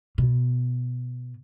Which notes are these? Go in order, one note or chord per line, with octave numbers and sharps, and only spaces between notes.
B2